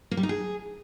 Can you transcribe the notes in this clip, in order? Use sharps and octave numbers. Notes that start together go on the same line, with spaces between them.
A#3
G3
D#4
G#4